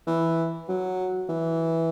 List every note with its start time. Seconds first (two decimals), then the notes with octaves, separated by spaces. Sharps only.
0.07 E3
0.69 F#3
1.29 E3